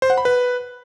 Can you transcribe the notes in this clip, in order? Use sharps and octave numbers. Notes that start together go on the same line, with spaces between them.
C5
F#5
B5
B4